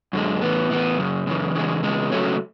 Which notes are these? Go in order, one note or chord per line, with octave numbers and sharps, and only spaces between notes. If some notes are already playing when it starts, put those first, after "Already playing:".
F#2 D3 G#3
A2 E3 B3
A2 E3 B3
F#2 C#3
F#2 C#3 E3
E2 C#3 E3 G#3
E2 C#3 G#3
C#3 F#3 A3 C#4